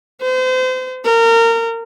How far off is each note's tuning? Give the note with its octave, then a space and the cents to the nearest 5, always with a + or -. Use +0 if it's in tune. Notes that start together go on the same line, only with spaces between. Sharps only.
C5 -35
A#4 -25